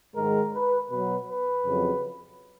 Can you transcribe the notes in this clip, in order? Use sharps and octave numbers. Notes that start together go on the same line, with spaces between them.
G#2 D#3 G#3 A#4
B4
B2 F#3 B4
B4
F2 C#3 F#3